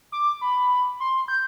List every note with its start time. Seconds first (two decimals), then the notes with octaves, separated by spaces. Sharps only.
0.12 D6
0.41 B5
1.00 C6
1.28 G6